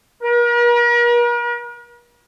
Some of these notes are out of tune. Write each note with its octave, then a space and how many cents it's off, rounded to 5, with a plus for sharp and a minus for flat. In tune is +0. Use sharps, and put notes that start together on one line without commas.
A#4 +45